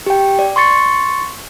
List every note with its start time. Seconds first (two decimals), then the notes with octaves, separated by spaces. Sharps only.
0.06 G4 G5
0.39 D5
0.56 C6 C#6 A6 C#7